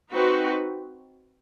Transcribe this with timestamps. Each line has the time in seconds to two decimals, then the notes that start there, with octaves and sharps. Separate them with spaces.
0.12 C4 D#4 F#4 B4